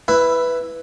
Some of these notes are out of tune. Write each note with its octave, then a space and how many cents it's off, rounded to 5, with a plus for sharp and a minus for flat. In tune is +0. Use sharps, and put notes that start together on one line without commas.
E4 +0 B4 +0 E5 +15